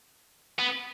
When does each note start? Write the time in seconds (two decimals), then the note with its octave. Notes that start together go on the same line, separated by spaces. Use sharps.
0.59 B3